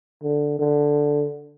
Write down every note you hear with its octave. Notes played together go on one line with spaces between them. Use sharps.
D3
D3